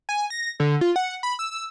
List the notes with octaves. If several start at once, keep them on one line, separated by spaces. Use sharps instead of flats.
G#5
A#6
D3
F4
F#5
B5
E6